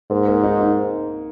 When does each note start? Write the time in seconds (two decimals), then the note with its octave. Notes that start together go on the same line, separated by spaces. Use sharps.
0.11 G#2 A#3
0.28 A#3
0.43 D#4
0.60 D#4